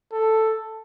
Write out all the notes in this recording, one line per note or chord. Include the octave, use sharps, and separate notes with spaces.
A4